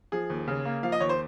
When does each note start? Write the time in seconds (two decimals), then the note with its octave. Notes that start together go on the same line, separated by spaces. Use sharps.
0.12 F3 G#4
0.30 D#2
0.48 C#3
0.65 A#3
0.83 F3 F5
0.92 D#5
1.00 D#2 C#5
1.09 C5